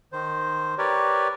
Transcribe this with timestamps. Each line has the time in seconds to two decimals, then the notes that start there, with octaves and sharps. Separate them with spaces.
0.12 D#3 C5
0.78 G4 A#4 B4 C#5 D5